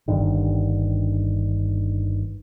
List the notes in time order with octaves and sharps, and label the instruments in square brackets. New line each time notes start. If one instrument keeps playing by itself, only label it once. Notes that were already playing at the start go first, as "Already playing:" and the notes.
[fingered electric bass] G1 G2 D3 D#3